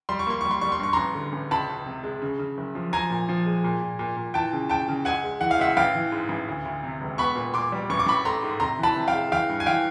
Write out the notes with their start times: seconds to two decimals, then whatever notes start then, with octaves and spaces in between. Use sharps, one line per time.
0.09 G3 C6
0.19 C#6
0.27 A#3 C6
0.41 G3 C#6
0.51 C6
0.61 G3 C#6
0.72 C6
0.79 G2 C#6
0.93 A1 A#5 C6
1.15 D3
1.33 A1
1.51 C#2 A5 B5
1.69 C#2
1.86 C3
2.04 G#3
2.22 C#3
2.39 C#3
2.57 F#1
2.75 F3
2.93 F3 G#5 A#5
3.10 A#2
3.29 F3
3.46 G#3
3.64 A#2
3.81 A#2
3.99 A#2
4.17 A#2
4.34 E3 G5 A5
4.53 C#3
4.70 C#3 G5 A5
4.88 C#3
5.05 C#2 F#5 G#5
5.24 G#3
5.41 E3 F#5
5.51 F5
5.59 C#2 E5 F#5
5.77 A1 F5 G5
5.95 E3
6.12 G#2
6.29 A1
6.48 D2
6.65 D2
6.84 C3
7.01 E1
7.18 B3 B5 C#6
7.36 A#2
7.54 A#2 C6 D6
7.72 G3
7.90 A1 C#6
7.99 D6
8.07 A1 B5 C#6
8.25 A3 A#5 C6
8.43 G#2
8.60 C3 A#5 C6
8.79 E3 A5 B5
8.96 C3
9.08 F5 G5
9.14 G#3
9.32 E3 F5 G5
9.50 G2
9.60 G#5
9.66 E3 F5 G5